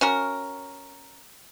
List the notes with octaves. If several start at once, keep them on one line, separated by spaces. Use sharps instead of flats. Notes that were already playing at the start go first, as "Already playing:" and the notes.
C#4 F#4 A#4